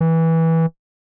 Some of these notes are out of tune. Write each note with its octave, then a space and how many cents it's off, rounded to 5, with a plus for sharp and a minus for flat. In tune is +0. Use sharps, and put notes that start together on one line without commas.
E3 -15